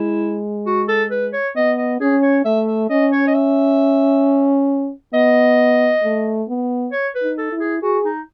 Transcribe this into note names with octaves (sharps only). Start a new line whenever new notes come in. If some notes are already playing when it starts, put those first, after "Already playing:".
Already playing: G#3 E4
F#4
A4
B4
C#5
B3 D#5
D#5
C#4 G#4
C#5
A3 E5
E5
C#4 D#5
C#5
D#5
E5
B3 D#5
A3
B3
C#5
B4
D#4
A4
E4
G#4
F#4 G#4
D#4